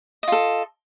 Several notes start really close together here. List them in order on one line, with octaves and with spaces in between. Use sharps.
D#5 F4 A4